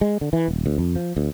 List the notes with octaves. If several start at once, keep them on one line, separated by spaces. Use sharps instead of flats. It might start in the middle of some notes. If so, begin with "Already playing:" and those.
G#3
D3
E3
D#1
D2
F2
F3
D2